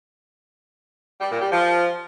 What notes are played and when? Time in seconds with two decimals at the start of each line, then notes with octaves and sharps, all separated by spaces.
1.21 G3
1.31 A#2
1.41 G3
1.52 F3